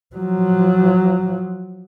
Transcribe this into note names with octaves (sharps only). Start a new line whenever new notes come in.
F3 F#3